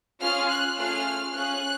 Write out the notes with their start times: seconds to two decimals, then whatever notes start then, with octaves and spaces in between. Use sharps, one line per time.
0.21 C#4 F4 G#4 F6
0.49 F#6
0.77 A3 C#4 F4 G#4 F6
1.34 C#4 F4 G#4 F#6